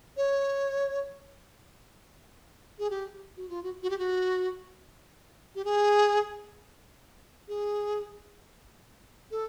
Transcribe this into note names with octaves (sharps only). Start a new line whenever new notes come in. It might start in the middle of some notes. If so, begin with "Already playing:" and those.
C#5
G#4
G4
F#4
F4
F#4
F#4
G4
F#4
G4
G#4
G#4
A4